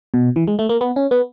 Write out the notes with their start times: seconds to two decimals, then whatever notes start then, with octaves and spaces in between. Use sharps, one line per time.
0.14 B2
0.36 E3
0.47 G#3
0.59 A3
0.69 A#3
0.81 B3
0.96 C#4
1.11 B3